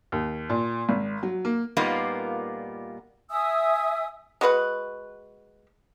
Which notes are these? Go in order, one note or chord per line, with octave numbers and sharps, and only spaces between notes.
D#2
A#2
G#1
F#3
A#3
A#2 G3 A#3 B3 D#4 F4
E5 G#5 D#6 E6
G#3 F#4 B4 F#5